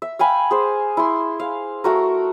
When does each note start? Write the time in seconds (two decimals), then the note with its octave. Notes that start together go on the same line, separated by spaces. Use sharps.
0.02 E5
0.19 F5 G5 G#5 B5
0.51 G#4 C5
0.97 E4 C6
1.40 F5
1.84 A3 F#4 A#4